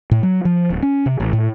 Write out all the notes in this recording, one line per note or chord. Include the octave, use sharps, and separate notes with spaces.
A2
F#3
F3
D1
C#4
C3
A1
A2